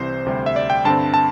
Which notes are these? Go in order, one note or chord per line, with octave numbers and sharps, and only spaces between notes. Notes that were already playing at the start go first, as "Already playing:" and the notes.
Already playing: C2 C3 E3 C4 C5
D2 C3 G3
E5
D5
G5
G2 D3 C4 A5
A5